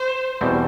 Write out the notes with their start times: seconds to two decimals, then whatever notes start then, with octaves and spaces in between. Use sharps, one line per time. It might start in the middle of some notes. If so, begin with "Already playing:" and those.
Already playing: C5
0.41 E2 B2 G3 C4